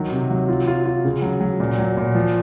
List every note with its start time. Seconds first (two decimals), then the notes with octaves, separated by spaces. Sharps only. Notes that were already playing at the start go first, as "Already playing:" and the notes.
Already playing: D#3 F#3
0.12 C3
0.30 F#3
0.49 F4
0.68 F4
0.86 F4
1.05 C#3
1.22 F#3
1.41 F#3
1.60 A#2
1.78 F#3
1.97 A#2
2.15 F3